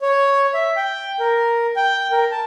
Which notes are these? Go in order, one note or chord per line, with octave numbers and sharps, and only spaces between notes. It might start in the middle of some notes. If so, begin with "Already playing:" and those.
C#5
E5
G5
A#4
G5
A#4
A5